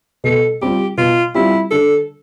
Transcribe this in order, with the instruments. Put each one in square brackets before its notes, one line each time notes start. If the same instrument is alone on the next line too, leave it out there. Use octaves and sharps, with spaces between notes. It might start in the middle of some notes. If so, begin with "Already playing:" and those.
[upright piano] B2 [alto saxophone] A4
[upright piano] G3 C4 F4 [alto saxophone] G4
[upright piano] B2 [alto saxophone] F4
[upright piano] G3 C4 F4 [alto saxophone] E4
[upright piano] D3 [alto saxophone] A4